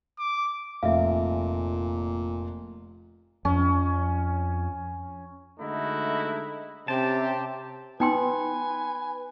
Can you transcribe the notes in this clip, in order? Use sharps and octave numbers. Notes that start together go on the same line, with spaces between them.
D6
F1 A#2 E5 F5
F2 C#4
D3 G#3 A3 D#4 E4 F#4
C3 C4 C#4 G4 A5
B3 D#4 B4 G5 G#5 C6